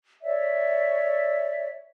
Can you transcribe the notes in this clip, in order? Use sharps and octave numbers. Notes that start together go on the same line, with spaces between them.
C#5 D5 E5